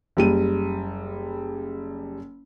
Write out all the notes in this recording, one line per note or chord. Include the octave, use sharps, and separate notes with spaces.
F#1 G3 D#7